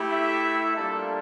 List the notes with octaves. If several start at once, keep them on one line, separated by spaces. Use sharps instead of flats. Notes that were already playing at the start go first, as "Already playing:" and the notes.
Already playing: A3 E4 G4
E5
G3 A#3 D4 F4 A4